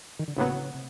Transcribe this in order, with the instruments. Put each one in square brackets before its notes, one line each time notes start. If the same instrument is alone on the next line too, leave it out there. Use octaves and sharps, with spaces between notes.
[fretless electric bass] D#3
D3
[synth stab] A#1 A2 F#3 B3 [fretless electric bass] C#3
[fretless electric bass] C3